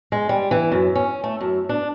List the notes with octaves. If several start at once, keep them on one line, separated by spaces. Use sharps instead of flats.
G#3
G3
E3
F#2
C#4
A3
F#2
D4